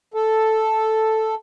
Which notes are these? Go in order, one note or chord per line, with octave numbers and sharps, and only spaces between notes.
A4